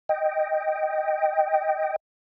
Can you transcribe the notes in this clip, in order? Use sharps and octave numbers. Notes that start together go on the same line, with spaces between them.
D#5 G5